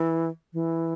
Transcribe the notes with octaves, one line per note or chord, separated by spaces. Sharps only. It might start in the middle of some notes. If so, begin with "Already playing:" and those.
Already playing: E3
E3